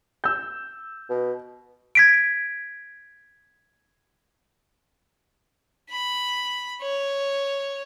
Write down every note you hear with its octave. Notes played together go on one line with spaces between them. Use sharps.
E6 G6
B2
G#6 B6 D7
B5
C#5